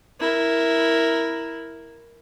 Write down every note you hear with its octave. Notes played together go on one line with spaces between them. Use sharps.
E4 A#4